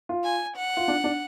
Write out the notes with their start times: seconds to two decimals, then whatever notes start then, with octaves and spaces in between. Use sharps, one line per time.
0.09 F4
0.24 G#5
0.57 F#5
0.77 F4
0.88 D4
1.04 D4